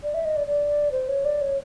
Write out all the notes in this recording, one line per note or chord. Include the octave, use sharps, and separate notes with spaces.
D5
E5
D#5
D5
D5
C5
C#5
D5
C#5